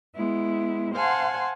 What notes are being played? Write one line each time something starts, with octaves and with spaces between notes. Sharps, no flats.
G#3 B3 E4
C5 F5 F#5 G#5 A5 C6